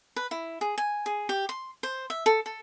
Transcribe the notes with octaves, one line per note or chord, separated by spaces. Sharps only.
B4
E4
G#4
G#5
G#4
G4
C6
C5
E5
A4
A4